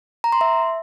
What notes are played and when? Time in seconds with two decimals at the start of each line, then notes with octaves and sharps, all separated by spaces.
0.24 A#5
0.32 C6
0.41 E5